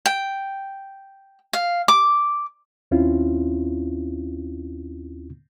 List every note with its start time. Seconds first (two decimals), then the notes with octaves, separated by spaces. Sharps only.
0.06 G5
1.53 F5
1.88 D6
2.91 D#2 C4 C#4 E4 F4